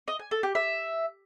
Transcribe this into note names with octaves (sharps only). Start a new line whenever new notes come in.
D#5
G#5
A4
G4
E5